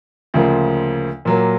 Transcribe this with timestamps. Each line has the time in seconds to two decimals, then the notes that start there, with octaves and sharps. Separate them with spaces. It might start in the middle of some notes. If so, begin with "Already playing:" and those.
0.34 D2 C#3 F3 A#3
1.25 A#2 F#3 A#3